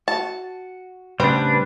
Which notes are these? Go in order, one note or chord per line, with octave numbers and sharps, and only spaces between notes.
F#4 A5
A2 C#3 G3 C4 D4 B4